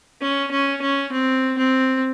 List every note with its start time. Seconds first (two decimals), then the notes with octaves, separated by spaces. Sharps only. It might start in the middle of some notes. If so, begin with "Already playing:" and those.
0.21 C#4
0.51 C#4
0.82 C#4
1.12 C4
1.58 C4